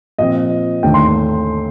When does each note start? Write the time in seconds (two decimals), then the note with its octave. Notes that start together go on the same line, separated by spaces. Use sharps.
0.18 A#2 F3 C4 D#5
0.83 D#2 D3 A3 G5
0.94 C6